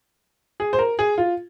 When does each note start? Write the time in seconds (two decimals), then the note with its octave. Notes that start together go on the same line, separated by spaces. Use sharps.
0.60 G#4
0.73 C5
0.79 A#4
0.99 G#4
1.18 F4